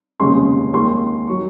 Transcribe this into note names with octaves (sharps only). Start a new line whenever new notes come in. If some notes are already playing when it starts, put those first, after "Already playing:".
F1 D#2 C#3 G#3 C6
D#2 D#3 G#3 C6
F#3 C#6